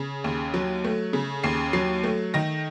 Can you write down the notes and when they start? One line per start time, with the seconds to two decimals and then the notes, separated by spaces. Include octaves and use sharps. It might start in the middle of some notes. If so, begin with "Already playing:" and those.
Already playing: C#3
0.24 D#2
0.54 F#3
0.84 A3
1.13 C#3
1.43 D#2 C7
1.73 F#3 C7
2.03 A3
2.34 D#3 A#6